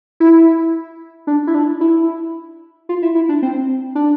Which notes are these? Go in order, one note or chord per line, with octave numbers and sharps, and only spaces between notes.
E4
D4
E4
D4
E4
F4
E4
E4
D4
C4
D4